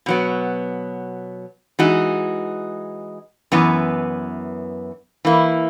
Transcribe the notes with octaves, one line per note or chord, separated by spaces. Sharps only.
B2 F#3 B3
E3 G#3 D#4 F#4
F#2 E3 B3
E3 A#3 E4